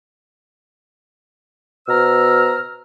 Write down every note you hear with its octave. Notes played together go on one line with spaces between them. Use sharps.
B2 C5 A#5 E6 F6